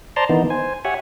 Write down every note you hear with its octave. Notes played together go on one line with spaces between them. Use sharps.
C5 D5 A5 A#5 C6
D#3 E3 B3 D#4
C5 G#5
G4 C#5 E5 F#5 G#5